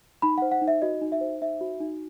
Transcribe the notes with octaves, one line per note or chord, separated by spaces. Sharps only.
D#4 B5
C5 F#5
F#5
D#4
E5
F#4 D#5
D#4
E5
C5
D#4 E5
F#4
D#4